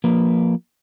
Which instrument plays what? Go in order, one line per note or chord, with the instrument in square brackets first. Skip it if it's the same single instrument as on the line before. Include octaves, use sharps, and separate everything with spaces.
[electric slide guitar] F3 A#3 B4